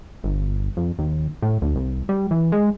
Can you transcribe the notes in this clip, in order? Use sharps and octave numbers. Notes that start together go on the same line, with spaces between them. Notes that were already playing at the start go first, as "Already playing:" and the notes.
G1
F2
D#2
A2
D2
C2
G3
E3
G#3